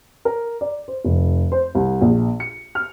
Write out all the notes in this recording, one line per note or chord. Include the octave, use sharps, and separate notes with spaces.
A#4
D5
C5
F1
C5
C2
A#1
C#7
F6